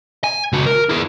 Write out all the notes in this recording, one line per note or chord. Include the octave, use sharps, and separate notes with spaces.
G#5
C#2 F#4
A#4
E4 G#4